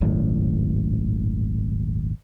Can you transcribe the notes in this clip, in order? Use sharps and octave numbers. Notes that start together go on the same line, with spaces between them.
D#1 G#1 F#2 A2